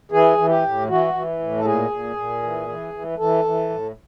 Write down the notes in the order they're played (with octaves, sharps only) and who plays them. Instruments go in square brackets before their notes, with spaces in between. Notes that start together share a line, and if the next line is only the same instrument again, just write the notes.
[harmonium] E3 G#4
E3
G4
A2
E3 F#4
E3
A2
A4
A#2 G#4
A#2
A#2
E3
E3
E3
E3 A4
E3
A2